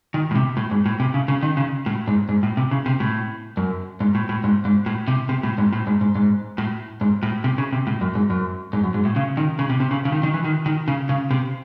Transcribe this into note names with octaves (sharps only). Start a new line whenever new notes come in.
D#3
A2
C3
A2
G#2
A2
C3
C#3
C#3
D#3
C#3
A2
G#2
G#2
A2
C3
C#3
C3
A2
F#2
G#2
A2
A2
G#2
G#2
A2
C3
C3
A2
G#2
A2
G#2
G#2
G#2
A2
G#2
A2
C3
C#3
C3
A2
F#2
G#2
F#2
G#2
F#2
G#2
A2
C#3
D#3
C#3
C3
C3
C#3
C#3
D#3
D#3
E3
D#3
D#3
C#3
C#3
C3